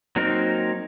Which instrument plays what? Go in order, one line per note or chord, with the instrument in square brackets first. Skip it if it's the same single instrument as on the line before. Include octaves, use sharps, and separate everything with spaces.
[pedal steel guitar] F#3 A#3 C4 D#4 A#4